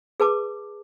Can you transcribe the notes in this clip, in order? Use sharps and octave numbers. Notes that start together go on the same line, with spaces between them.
G#4 B4 A5 D6